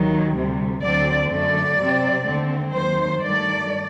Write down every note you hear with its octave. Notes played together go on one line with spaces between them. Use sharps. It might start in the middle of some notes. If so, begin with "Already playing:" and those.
Already playing: D#2 D#3 F#3
D2 C3 G3
D2 D3 F#3 C4 D5
F#2 D3 A3 D5
C3 F#3 C4
D#2 D3 A3 C4
D#2 D#3 F#3 C5
G2 D#3 F#3 A3 D5